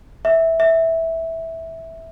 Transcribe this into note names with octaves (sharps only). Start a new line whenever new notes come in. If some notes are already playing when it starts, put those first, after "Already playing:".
E5
E5